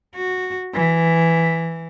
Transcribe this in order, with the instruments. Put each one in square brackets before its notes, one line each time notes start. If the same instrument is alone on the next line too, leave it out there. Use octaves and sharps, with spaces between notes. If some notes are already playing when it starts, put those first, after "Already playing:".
[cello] F#4
E3